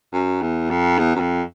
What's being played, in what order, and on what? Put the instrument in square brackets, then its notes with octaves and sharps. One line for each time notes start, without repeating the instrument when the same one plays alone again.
[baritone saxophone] F#2
E2
F2
E2
F#2
F2